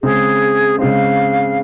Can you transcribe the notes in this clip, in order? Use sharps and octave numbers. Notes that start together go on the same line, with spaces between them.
C#3 G#3 C4 G#4
C#3 G#3 C4 F5